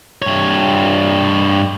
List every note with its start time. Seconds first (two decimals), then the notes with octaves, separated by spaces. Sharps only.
0.22 G2 C#5